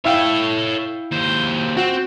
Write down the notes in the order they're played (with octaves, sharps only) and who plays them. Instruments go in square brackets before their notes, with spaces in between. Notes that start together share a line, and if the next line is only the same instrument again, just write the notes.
[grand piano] E4 F5 G5 [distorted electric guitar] A4 C#5
[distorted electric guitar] D#2 C5
[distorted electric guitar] C4 [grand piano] F#4